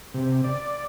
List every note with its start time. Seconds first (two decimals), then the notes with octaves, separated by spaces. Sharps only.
0.14 C3
0.44 D5